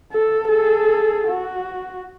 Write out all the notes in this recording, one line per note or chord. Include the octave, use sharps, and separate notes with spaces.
A4
G#4 A4
F#4